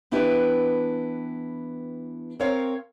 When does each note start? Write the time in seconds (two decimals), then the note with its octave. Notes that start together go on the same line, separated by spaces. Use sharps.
0.11 E3 B3 D4 E4 G4 B4
2.40 C4 A#4 C5 C#5 F5